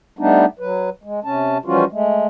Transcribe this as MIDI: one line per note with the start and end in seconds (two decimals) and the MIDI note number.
0.19 0.46 55
0.19 0.46 57
0.19 0.46 59
0.19 0.46 62
0.19 0.46 63
0.59 0.90 54
0.59 0.90 71
1.03 1.20 56
1.24 1.58 48
1.24 1.58 61
1.24 1.58 81
1.65 1.85 52
1.65 1.85 53
1.65 1.85 55
1.65 1.85 61
1.65 1.85 65
1.65 1.85 66
1.92 2.27 56
1.92 2.27 57